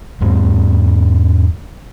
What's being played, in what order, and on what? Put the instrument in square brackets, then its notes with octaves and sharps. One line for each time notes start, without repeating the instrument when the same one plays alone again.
[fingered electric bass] E2 G#2 G#3 C4